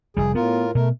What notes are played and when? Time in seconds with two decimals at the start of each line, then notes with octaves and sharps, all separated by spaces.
0.17 F1 G3 G#4
0.35 A2 B3 F4 A#4
0.75 B2 A3 A#4